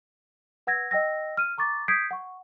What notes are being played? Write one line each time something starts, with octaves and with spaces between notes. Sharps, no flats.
B4 F#5 E6 G#6 A#6
D#5 G5 E6 A#6
F6 D#7
A#5 C#6 D6 A6
D#6 G6 G#6 B6 C7 D7
F#5 C#6